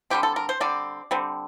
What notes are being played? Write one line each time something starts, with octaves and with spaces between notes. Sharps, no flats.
D3 G3 C4 G4
A4
A#4
C5
D3 G3 C4 D5
D3 G3 C4